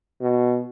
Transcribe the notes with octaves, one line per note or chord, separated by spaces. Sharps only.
B2